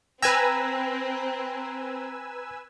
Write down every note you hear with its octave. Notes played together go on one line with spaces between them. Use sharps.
C4 B4 G5 G#5 A#5 B5 E6